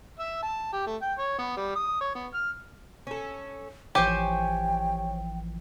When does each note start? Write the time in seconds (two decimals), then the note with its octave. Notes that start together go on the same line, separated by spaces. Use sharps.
0.20 E5
0.43 A5
0.73 G4
0.86 A3
1.02 G5
1.19 C#5
1.38 B3
1.57 G3
1.76 D#6
2.01 C#5
2.15 B3
2.34 F6
3.07 C#4 A4
3.95 A1 E3 F3 G4 C5 C#5 G5 G#5